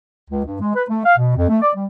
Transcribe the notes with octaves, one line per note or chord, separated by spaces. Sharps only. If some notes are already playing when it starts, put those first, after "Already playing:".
C#2
G2
G#3
B4
A3
F5
B2
F2
A3
D5
G3